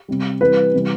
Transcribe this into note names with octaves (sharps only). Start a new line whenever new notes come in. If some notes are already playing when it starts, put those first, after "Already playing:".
C3 G3
C3 E3 G3 B4
C3 E3 G3